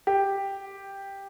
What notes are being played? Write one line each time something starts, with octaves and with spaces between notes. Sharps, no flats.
G4